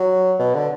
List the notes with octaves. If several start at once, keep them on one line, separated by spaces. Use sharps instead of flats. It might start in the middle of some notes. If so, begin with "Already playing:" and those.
Already playing: F#3
B2
D3